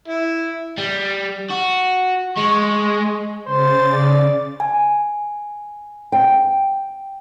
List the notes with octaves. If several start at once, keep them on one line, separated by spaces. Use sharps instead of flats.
E4
G3
F#4
G#3 C#6
C#3 C5 A6
D5
G#5
G5